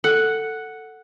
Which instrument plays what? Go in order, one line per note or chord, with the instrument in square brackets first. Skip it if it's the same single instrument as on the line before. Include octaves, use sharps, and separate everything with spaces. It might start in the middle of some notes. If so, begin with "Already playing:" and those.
[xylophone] A4 [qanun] F#5